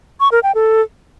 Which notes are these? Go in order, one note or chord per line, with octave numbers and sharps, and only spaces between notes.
C#6
A#4
G5
A4